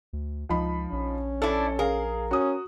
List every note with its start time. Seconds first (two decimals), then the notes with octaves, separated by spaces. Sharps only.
0.13 D2
0.49 C#2 F3 D#4 B5
0.92 A#1 C#4
1.42 D4 E4 A4
1.79 G#4 A#4 F5
2.31 C#4 F#4 D#6